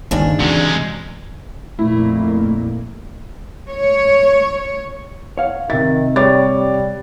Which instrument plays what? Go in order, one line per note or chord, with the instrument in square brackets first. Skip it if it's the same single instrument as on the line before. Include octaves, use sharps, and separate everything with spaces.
[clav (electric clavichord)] G1 D#2 [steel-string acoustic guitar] C#3 D4 [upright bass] D#4
[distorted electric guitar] C3 G#3 [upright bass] E3 [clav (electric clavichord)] F#4
[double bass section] F2 A#2 A#3 [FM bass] A3 [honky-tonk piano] E4
[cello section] C#5
[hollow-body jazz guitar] C#5 F5 F#5
[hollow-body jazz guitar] C3 E5 [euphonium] D#3 [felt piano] A6
[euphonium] G3 [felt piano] C#5 D6 A6
[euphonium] G3